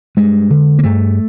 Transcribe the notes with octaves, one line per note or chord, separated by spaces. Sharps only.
G2 G#3
D3
A#3
G2 A3